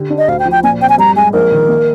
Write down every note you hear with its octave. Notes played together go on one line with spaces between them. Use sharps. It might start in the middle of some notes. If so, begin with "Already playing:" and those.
Already playing: D3 G4
D4
D#5
D2 F5
G5
F3
G5
A#2 G#5
C4 G5
G#5
G2 A#5
G#3 G#5
A#1 A#4
D#3
A#3